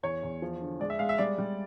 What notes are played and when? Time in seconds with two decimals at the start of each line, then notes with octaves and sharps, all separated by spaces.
0.03 E2 C#5
0.23 E2
0.42 F3
0.61 D3
0.80 G#3 D5
0.90 E5
0.99 G#3 F5
1.09 E5
1.18 G3 D5
1.38 G3